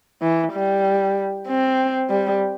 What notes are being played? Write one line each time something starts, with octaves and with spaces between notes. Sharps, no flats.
E3
G3
C4
G3